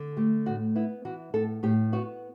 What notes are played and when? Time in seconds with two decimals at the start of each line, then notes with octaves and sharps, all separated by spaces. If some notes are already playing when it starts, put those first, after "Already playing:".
Already playing: D3
0.17 A3 G4
0.46 A2 F#4
0.75 B3 E4
1.05 E3 F#4
1.34 A2 A4
1.63 A2 G4
1.92 B3 F#4